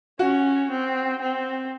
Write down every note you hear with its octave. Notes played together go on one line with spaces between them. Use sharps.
C#4 F#4
C4
C4